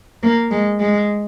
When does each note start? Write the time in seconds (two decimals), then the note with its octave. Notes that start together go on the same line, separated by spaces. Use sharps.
0.23 A#3
0.51 G#3
0.80 G#3